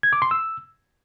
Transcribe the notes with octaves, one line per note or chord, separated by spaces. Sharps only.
G#6
D6
C6
E6